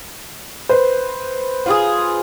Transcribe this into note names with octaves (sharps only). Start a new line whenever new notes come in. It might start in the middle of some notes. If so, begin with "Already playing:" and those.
B4 C5
F4 F#4 G#4